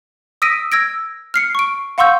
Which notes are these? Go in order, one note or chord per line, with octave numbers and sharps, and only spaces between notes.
D#6 E6 A#6 B6 D7 D#7
E6 G#6 A#6 D7
F6 C7 C#7
C#6 D7
F5 F#5 C6 C#6 E6 G6